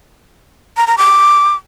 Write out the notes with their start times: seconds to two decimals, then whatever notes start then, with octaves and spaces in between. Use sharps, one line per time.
0.77 A#5
0.87 A#5
0.98 D6